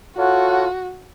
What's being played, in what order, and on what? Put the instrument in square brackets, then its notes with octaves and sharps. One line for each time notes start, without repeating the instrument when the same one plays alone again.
[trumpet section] F4 A4 C#5 F#5 [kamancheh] F#4